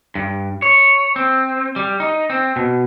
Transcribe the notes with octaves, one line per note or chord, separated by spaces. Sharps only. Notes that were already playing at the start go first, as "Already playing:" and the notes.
G2
C#5
C4
G3
D#4
C4
B2